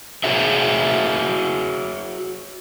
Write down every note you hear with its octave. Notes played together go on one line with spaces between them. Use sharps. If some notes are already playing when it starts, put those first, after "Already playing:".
F#4 G#4 C#5 E5